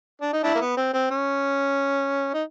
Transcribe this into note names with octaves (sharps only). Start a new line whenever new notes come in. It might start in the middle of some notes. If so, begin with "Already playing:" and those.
D4
D#4
D4 E4
A#3
B3
C4
C4
C#4
D#4